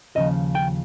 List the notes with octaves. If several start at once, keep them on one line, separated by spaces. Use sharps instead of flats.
D#2 C#3 F3 D#5
G5